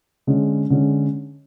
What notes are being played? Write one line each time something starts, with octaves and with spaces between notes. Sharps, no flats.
D3 G#3 C#4
D3 G#3 C#4